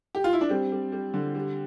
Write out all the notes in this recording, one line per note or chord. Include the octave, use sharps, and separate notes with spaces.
G4
F4
E4
D4
G3 C4
G3
G3
D3
G3